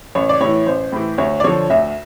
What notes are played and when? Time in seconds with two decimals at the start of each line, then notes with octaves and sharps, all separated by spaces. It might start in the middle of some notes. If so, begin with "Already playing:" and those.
0.15 A1 C#5
0.29 D5
0.40 A2 E3 C#5
0.66 A1 C5
0.92 A2 E3
1.18 D2 C#5
1.40 D5
1.44 D3 F3 C#5
1.70 D2 E5